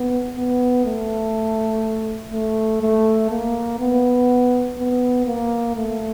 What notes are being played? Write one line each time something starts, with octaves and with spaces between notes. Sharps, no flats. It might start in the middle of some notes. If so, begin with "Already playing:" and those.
Already playing: B3
B3
A3
A3
A3
A#3
B3
B3
A#3
A3